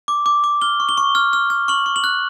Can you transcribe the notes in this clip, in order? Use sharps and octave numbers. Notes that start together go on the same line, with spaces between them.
D6
D6
D6
F6 G7
C#6
G7
C#6
F6
F6
F6
C#6 F#7
C#6
F#7
F#6